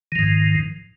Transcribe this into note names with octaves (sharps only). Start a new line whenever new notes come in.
G#2 D#3 F3